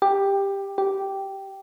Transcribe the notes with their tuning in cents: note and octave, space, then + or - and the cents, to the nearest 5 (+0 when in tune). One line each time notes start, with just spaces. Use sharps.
G4 +10
G4 -10